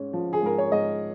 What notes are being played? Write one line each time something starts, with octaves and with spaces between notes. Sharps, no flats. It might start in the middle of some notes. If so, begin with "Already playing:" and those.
Already playing: G#2 C#4
F3
G#4
G#2 A#4
C#5
G#2 D#5